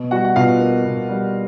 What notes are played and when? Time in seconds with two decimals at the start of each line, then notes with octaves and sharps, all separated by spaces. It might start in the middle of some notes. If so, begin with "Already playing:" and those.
Already playing: B2
0.11 G3 F#4 F#5
0.25 F#5
0.36 B2 F4 F5
0.60 A#3
0.85 B2
1.09 G3